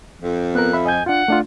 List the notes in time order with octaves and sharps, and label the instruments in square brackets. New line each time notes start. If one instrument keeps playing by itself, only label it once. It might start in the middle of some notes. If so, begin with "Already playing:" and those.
[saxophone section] F2
[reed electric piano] B3 A#4 [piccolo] F#6
[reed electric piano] E5 B5
[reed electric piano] D#5 G6 [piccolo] G#5
[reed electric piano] D4 F4 [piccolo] F#5
[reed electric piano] A3 D4 F4